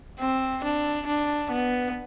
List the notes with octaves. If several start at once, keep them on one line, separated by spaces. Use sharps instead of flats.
C4
D4
D4
B3